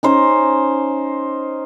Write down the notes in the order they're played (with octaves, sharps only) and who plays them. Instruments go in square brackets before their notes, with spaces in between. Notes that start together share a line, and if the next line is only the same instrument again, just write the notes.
[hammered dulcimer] C#4 D#4 C5